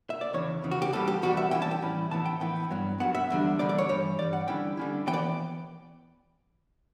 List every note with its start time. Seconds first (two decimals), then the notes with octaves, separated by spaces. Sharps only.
0.10 E5
0.21 D5
0.33 E2 C#3 E3 C#5
0.63 E2 C#3 E3
0.71 F#4
0.82 G4
0.93 E2 B2 G3 A4
1.08 G4
1.22 E2 B2 G3 F#4
1.37 E5
1.51 A2 E3 G3 C#4 E4 G5
1.62 A5
1.71 G5
1.81 A2 E3 G3 C#4 E4
2.11 A2 E3 B3 E4 A5
2.26 G5
2.40 A2 E3 B3 E4 G5
2.71 G2 F#3 B3
3.00 G2 F#3 B3 F#5
3.15 E5
3.30 E2 D3 G3 D4
3.59 E2 D3 G3 D4 D5
3.69 D5
3.78 C#5
3.89 G2 E3 G3 C#5
4.19 G2 E3 G3 D5
4.33 F#5
4.48 D3 G3 C#4 E4 G5
4.77 D3 G3 C#4 E4
5.07 E3 B3 G5
5.13 D5